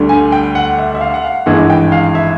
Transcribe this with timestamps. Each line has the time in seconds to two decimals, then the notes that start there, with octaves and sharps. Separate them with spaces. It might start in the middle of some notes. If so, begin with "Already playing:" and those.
Already playing: D2 D3 G3
0.09 G#5
0.32 G5
0.55 F#5
0.78 E5
0.95 E5
1.01 F5
1.14 F#5
1.24 F5
1.46 G#1 G2 E3 G#3 F#5
1.70 G5
1.92 F5
2.15 E5